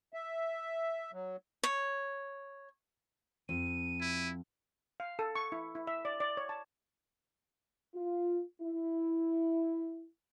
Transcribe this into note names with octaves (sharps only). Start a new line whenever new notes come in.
E5
F#3
C#5
F2 D#7
E4
F5
A4
C#6
E4
E4
E5
D5
D5
C#5
A5
F4
E4